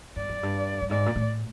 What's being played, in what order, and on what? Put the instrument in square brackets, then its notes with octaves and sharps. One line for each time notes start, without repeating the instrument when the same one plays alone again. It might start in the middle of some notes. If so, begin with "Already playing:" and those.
[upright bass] G2 [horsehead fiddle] D5
[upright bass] F#2
G2
G2
[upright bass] G#2 [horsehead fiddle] D5
[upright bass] A#2
A2